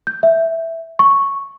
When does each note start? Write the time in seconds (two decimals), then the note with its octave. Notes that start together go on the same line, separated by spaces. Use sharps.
0.07 G6
0.23 E5
0.99 C#6